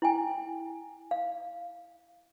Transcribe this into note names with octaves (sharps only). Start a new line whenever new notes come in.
E4 G5 G#5
F5